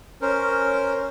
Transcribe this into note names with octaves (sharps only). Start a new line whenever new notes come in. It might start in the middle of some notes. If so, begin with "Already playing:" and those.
C#4 A#4 C5